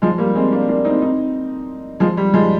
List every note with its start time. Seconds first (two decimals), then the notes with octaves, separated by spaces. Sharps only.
0.02 F3 G#3
0.18 G3 A#3
0.35 G#3 C4
0.52 A#3 D4
0.69 A#3 D4
0.85 C4 D#4
1.02 C4 D#4
2.00 F3 G#3
2.17 G3
2.34 F3 G#3